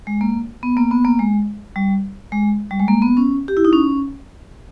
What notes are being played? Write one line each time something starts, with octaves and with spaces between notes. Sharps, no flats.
G#3
A#3
B3
A#3
B3
A#3
G#3
G3
G#3
G3
G#3
A#3
B3
C#4
G4
E4
D#4
C#4